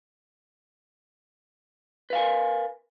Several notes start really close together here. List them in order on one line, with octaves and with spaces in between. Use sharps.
B4 F5 G#5 A#4